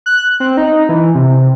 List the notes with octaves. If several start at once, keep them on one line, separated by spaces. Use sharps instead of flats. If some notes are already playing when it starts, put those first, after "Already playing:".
F#6
C4
D#4
E3
C3